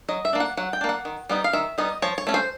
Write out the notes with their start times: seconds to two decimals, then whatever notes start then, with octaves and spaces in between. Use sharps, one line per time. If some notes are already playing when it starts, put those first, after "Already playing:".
0.09 F#3 D#5
0.25 E5
0.33 A#3 D4
0.40 F#5
0.57 F#3 F#5
0.73 G5
0.81 A#3 D4
0.89 F#5
1.05 D#3
1.30 G3 B3 D#4
1.44 F5
1.53 D#3 E5
1.78 G3 B3 D#4 D#5
2.02 F3 C#5
2.18 C#5
2.27 A3 C#4
2.34 C5